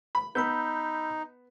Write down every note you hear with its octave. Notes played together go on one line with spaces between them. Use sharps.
B5
B3 D#4 B5 E6 G6